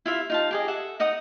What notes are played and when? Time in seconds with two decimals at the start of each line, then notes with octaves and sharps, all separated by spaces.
0.06 E4 F4 E5
0.30 D#4 F4 A5
0.51 G4 G#4 D#5
0.68 A4 E5 F#5
1.00 D#4 D#5 F#5 D#6